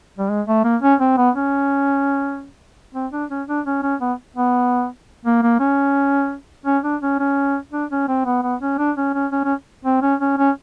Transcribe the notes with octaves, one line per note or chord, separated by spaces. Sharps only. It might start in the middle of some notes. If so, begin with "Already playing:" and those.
G3
G#3
A3
A#3
C#4
C4
B3
C#4
C4
D4
C#4
D4
C#4
C#4
B3
B3
A#3
A#3
C#4
C#4
D4
C#4
C#4
D4
C#4
C4
B3
B3
C#4
D4
C#4
C#4
C#4
C#4
C4
C#4
C#4
C#4